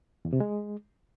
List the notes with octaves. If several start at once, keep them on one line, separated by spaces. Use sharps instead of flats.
E2
C3
G#3